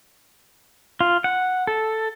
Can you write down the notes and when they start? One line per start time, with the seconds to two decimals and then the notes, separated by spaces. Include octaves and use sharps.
1.01 F4
1.24 F#5
1.67 A4